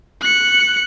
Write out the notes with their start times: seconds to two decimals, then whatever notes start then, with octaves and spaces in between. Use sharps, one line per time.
0.22 F#6 C#7